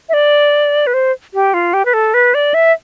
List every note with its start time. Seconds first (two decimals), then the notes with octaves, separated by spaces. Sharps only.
0.09 E5
0.13 D5
0.87 B4
0.94 C5
1.34 G4
1.54 F4
1.74 G4
1.85 B4
1.94 A4
2.14 B4
2.34 D5
2.54 E5